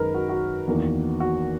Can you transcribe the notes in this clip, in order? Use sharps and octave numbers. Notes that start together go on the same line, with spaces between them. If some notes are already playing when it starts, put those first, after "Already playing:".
Already playing: F#2 D#3 G#3 D#4 A#4 B4
F#4
F#4
E2 D#3 A#3
F#4